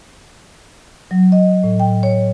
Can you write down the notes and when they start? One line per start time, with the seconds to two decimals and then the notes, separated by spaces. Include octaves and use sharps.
1.11 F#3
1.32 D#5
1.64 A2
1.80 G5
2.03 C#5